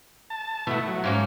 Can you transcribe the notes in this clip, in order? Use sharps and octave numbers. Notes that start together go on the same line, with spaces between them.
A5
B2 A3 E4 F#5
F#3
G#2 A#3 C#4